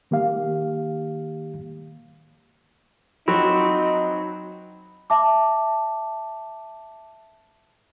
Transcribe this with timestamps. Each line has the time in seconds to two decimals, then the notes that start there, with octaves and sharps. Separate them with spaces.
0.11 D#3 A#3 G4 F5
3.28 F#3 C4 D#4 F#4 B5
5.10 E5 A5 D6